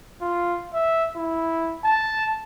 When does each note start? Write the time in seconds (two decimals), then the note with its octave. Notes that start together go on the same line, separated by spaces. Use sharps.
0.22 F4
0.74 E5
1.16 E4
1.84 A5